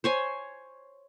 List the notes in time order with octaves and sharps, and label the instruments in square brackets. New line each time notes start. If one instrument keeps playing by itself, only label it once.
[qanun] C5 C#5 G#5